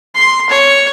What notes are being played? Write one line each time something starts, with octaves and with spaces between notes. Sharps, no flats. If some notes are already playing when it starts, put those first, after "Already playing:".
C6
C#5